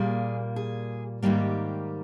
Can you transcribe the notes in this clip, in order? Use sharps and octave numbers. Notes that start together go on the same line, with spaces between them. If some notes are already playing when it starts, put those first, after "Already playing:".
Already playing: A#2 G3 A#3 G#4
G#4
G#2 D#3 G3 A#3 G4